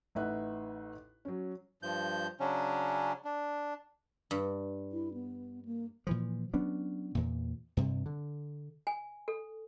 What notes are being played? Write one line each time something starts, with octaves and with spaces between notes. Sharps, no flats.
A1 D#4 B4 E5 F#5 F#6
F#3 C#4
G2 F3 G6
C#3 F#3 C#4 D4
D4
G2
E4
B3
A#3
A#2 E3 F3
F#3 B3 C#4 D4
E2 A#2
G2 C3
D3
G#5
A4